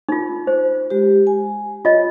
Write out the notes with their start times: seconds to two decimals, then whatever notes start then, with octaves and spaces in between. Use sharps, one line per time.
0.09 D#4 F4
0.47 C5
0.90 G#3 G4
1.27 G#5
1.85 F4 C#5 D#5